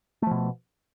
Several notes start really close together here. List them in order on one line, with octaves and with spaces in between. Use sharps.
A3 F3 B2